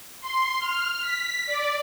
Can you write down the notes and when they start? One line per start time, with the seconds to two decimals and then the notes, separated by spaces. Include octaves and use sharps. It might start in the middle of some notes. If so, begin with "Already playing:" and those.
0.21 C6
0.59 F6
1.01 B6
1.46 D5